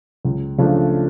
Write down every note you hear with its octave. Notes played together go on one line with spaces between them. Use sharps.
C#2
C#3 F3 A3 D4